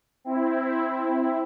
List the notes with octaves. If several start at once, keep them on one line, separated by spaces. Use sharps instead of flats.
C4 E4